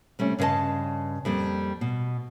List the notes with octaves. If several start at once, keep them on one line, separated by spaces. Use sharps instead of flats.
C3 G3 A3 C#4
G2 C#3 B4 D#5 A5
F2 G3 A#3
B2